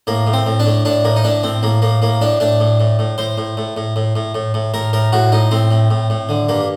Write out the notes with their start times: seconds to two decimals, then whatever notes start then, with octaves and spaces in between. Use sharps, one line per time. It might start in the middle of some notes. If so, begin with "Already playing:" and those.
0.07 A2 A#3
0.27 A2
0.33 C4
0.47 A2
0.60 D4
0.66 A2
0.85 A2 D4
1.05 A2 A#3
1.16 D#4
1.24 A2 D4
1.43 A2 C4
1.63 A2 A#3
1.82 A2 A#3
2.02 A2 A#3
2.21 A2 D4
2.40 A2 D4
2.60 A2
2.80 A2
2.99 A2
3.18 A2 C5
3.38 A2
3.57 A2
3.77 A2
3.96 A2
4.16 A2
4.35 A2
4.54 A2
4.74 A2 A#4
4.93 A2 A#4
5.12 A2 F#4
5.32 A2 D#4
5.51 A2 C4
5.71 A2
5.91 A2
6.10 A2
6.29 D3
6.49 G2 A#3